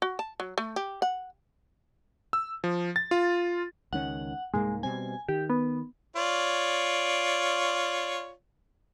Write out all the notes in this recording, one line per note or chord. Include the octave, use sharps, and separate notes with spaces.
F#4
A5
F#3
A3
G4
F#5
E6
F3
A6
F4
C#2 D#3 C#4 F#5
C2 G#2 G#3 A#3
B2 G3 C4 G#5
D#3 G4
B3
F4 C#5 D5